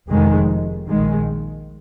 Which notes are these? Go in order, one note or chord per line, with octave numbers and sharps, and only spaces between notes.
F1 F2 C3 D#3 G#3
A#1 A#2 D#3 G#3